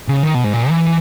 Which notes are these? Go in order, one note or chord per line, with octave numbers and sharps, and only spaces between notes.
C#3
D#3
B2
G#2
A#2
E3